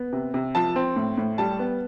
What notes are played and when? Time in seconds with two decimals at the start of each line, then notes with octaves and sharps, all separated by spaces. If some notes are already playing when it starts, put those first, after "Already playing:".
Already playing: B3
0.13 C3
0.34 C3
0.55 F3 A5
0.76 C4
0.96 A2
1.18 A2
1.38 G3 A5
1.59 B3